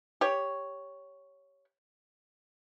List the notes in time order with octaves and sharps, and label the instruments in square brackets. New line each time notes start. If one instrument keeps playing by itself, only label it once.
[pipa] G4 C#5